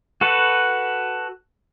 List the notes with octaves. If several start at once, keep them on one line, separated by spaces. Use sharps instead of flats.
F#4 A4 B4